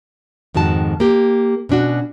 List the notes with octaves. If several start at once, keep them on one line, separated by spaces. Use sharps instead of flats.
F2 G#2 D#3 F#4 A5
A#3 G4
B2 C#4 D4 F#4